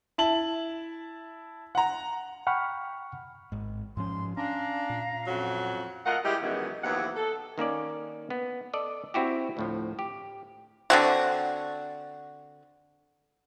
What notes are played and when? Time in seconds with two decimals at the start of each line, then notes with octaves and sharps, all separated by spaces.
0.18 E4 A5 F#7
1.75 F#5 A#5
2.47 F#5 G5 B5 C#6 F6
3.52 G#1 G#2
3.97 G#2 F3 C#4 C6
4.37 C#4 D4 F5 A#5
4.90 A#2
5.27 F2 F#3 C#4 F#5
6.06 A3 F4 A#4 D#5 F#5
6.25 G3 G#3 E4 G4
6.42 F#2 D#3 E3 F#3 G#3 B3
6.83 D#2 C3 E3 F#3 B3 F#5
7.16 A4
7.58 D#3 A#3 C#4 D5
8.30 B3
8.74 A4 D5 D#5
9.14 C4 E4 F#4 G4
9.57 D2 A2 F3
9.99 G4
10.90 D3 C4 F#4